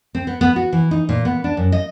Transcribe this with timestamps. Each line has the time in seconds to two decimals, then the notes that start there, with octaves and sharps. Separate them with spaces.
0.15 C4
0.27 B3
0.41 B3
0.56 F#4
0.72 E3
0.91 D#4
1.09 A#2
1.25 B3
1.44 D4
1.57 F#2
1.72 D#5